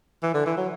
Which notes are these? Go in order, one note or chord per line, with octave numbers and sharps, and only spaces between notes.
E3
D3
E3
F#3